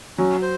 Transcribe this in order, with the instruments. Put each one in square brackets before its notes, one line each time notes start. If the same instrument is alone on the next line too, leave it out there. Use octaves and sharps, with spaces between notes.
[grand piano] F#3 [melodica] C#4
[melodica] C5